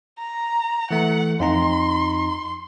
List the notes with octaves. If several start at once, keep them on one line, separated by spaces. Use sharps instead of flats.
A#5
E3 A3 F#5
F2 D#4 A#5 C6
C6